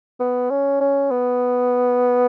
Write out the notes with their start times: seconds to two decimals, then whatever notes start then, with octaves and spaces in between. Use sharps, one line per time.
0.20 B3
0.50 C#4
0.81 C#4
1.11 B3